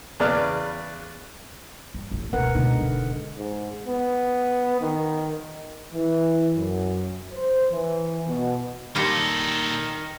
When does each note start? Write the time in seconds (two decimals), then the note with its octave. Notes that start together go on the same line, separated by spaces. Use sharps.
0.20 E2 C#3 B4 D5 F6
1.94 G2
2.11 A1 A2
2.33 E1 C#2 A#4 B4 F#5
2.55 B2 D3 G#3 D#4
2.81 E1 C#3
3.37 G#2
3.86 B3
4.81 D#3
5.94 E3
6.56 F#2
7.34 C5
7.72 E3
8.28 B2
8.96 A#2 D#3 G3 F4 A4 G5 A#6 C#7